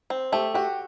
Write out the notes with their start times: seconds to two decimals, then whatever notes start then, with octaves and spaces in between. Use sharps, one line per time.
0.10 C4
0.32 A3 G4
0.54 F#4 G4